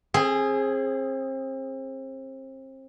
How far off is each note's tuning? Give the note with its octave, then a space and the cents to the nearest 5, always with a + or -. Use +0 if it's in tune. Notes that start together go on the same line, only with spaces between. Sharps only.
C4 +35 G#4 +0